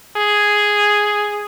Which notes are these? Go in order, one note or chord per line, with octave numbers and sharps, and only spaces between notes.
G#4